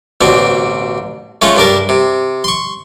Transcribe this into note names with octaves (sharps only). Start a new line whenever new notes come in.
A1 D2 B2 C4 D4
G#3 A3 C#4 F4 C#5
G2 D4 A#4 A5
C3
C6 C#6